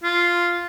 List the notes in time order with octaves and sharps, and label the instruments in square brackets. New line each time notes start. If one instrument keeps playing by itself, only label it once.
[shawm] F4